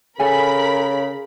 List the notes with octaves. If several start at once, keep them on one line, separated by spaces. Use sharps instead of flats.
C#3 A4 A#4 G#5 B5